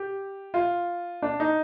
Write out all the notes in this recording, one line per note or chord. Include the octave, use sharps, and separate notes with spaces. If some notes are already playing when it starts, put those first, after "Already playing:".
Already playing: G4
F4
D4
D#4